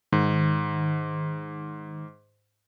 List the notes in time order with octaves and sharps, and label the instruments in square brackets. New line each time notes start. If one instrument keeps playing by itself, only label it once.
[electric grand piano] G#2 [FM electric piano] D#3